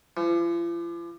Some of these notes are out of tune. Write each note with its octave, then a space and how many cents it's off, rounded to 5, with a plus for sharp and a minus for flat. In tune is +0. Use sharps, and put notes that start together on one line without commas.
F3 -45